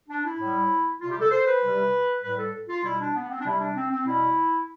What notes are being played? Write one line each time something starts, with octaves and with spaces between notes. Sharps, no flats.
D4
E4
A2 G3
C3 G3 F4
G4
A4
C5
B4
C3 G3
A2 G3 B4
A4
F4
B2 G3 E4
D4
B3
C4
D4
C3 G3 E4
D4
C4
C4
B2 G3 E4